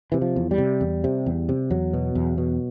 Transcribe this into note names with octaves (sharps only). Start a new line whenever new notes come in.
C3 E3
F3
E2
G3
C3
E2
C3
E2
C3
E2 F#3
B2
E2
B2